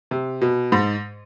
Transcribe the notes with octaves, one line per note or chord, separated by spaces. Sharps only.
C3
B2
G#2